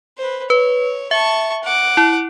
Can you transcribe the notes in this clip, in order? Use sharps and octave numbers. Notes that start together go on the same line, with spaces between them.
B4 C5
B4 C#5
E5 A5 C#6
F#5 D6
E4